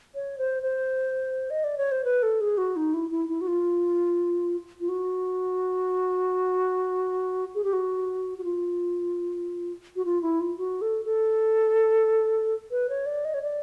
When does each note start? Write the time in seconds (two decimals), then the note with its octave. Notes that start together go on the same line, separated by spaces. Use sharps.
0.15 C#5
0.38 C5
0.63 C5
1.50 D#5
1.64 D5
1.78 C#5
1.92 C5
2.04 B4
2.23 A4
2.41 G#4
2.58 F#4
2.76 D#4
2.94 E4
3.11 E4
3.29 E4
3.41 F#4
3.47 F4
4.80 F4
4.89 F#4
7.55 G#4
7.64 G4
7.73 F#4
8.38 F#4
8.44 F4
9.96 F#4
10.05 F4
10.22 E4
10.40 F4
10.58 F#4
10.82 A4
11.05 A4
12.71 B4
12.89 C#5
13.06 D5
13.25 D#5
13.34 C#5
13.43 D5